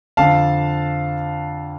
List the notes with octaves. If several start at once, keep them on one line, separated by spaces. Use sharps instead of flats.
F2 D3 F3 F5 A5